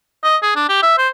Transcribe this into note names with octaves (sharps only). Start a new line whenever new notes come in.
D#5
G#4
D4
G4
E5
C5